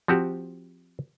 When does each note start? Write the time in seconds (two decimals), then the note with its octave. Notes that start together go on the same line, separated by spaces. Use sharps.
0.08 F3 C4 F#4 G4